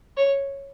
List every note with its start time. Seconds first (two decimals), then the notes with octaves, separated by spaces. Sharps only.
0.17 C#5